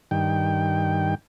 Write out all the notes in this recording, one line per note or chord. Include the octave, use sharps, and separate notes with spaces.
G2 D#3 G5